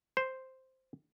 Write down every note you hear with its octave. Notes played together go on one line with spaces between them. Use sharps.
C5